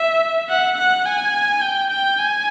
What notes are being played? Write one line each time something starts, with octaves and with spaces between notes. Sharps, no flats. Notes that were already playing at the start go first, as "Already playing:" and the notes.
Already playing: E5
F#5
F#5
G#5
G5
G5
G#5